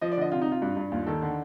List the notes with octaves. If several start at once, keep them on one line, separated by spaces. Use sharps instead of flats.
F3 D#5
D5
D3 D#5
C3 F4
D#4
C3
F4
G2
G2
D#2 F4
D#3 A4
D3